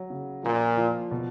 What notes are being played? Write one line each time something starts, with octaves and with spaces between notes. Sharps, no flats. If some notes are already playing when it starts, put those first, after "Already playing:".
Already playing: F#3
C#3
A#2 F3
F3
B2